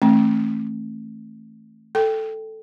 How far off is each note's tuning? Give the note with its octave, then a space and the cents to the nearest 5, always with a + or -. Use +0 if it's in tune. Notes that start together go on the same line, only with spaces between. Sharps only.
E3 -25 A3 +0 C4 +45
A4 +0 G5 +0